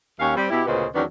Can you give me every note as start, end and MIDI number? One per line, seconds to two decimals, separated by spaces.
0.19 0.34 39
0.19 0.34 61
0.19 0.34 73
0.19 0.34 77
0.36 0.47 55
0.36 0.47 60
0.50 0.62 47
0.50 0.62 64
0.50 0.62 67
0.66 0.85 38
0.66 0.85 46
0.66 0.85 49
0.66 0.85 59
0.66 0.85 72
0.66 0.85 75
0.94 1.03 40
0.94 1.03 51
0.94 1.03 54
0.94 1.03 59
0.94 1.03 61
0.94 1.03 62